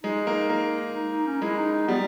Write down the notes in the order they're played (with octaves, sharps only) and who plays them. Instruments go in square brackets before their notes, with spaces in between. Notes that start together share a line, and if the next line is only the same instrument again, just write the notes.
[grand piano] G#3 [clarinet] D#4
[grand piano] A#3 [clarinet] D#4
[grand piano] A#3
[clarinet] D#4
D#4
C#4
[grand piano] G#3 [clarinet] E4
[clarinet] D#4
D#4
[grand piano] G3 [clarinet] B3